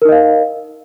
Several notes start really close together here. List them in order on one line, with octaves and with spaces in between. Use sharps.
A#4 D#4 D#5 F5